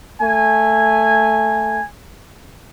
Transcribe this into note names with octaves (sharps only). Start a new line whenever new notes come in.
A3 G#5